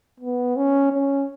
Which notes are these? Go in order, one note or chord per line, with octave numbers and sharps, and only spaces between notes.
B3
C#4
C#4